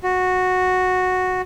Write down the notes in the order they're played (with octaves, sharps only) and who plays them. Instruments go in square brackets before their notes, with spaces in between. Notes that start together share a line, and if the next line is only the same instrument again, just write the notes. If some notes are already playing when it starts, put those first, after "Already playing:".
[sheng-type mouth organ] F#4